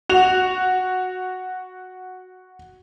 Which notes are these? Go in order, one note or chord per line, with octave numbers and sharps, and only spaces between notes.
F#4 F7